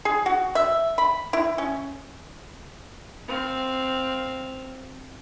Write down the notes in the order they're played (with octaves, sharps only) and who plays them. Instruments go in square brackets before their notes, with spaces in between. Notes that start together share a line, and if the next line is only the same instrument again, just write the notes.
[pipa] G#4
F#4
E5
B5
E4
C#4
[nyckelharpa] C4 F5